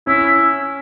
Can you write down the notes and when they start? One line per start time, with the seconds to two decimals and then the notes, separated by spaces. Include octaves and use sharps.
0.07 C#4 E4